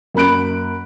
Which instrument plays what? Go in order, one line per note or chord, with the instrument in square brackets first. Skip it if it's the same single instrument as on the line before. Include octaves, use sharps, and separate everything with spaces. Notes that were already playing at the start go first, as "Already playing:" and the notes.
[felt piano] F#2 A#3 B5 F#6 D7